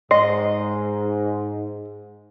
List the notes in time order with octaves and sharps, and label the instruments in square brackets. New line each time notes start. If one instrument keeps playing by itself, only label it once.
[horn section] G#2 [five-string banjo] D#5 [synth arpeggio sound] C6